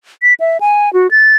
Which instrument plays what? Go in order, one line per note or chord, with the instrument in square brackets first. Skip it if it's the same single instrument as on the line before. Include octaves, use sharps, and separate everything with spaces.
[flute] B6
E5
G#5
F#4
A6